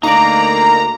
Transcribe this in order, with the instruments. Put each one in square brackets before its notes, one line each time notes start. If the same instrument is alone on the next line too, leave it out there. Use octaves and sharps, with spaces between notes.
[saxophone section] D2 A#3 [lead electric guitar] D#4 D5 [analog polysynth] A#5